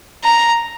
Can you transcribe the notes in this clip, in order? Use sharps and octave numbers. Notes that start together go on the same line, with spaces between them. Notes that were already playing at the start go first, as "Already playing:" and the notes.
A#5